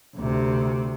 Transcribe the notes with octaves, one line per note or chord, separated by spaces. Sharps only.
D2 C3